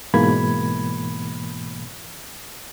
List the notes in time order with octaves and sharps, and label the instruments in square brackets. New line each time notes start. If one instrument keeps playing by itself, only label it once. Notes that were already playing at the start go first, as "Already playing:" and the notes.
[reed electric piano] G#2 B2 E3 A#3 B5 G#6